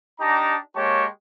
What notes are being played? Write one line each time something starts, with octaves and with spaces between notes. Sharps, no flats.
D4 D#4 G4 A5 A#5
G#3 A#3 G4 C#5 A5 C#6